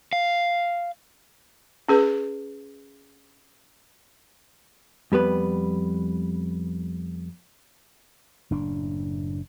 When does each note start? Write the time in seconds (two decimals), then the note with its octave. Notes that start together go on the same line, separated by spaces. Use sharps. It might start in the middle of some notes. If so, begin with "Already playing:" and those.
0.13 F5
1.89 C#4 G#4 B4
5.12 F2 G3 B3 B4
8.51 F#1 A2 D4